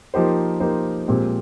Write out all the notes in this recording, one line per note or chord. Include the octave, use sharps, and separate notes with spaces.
F3 A#3 D#4 G4 C5
F3 A#3 D#4 G4 C5
A#2 F3 G#3 C4 G4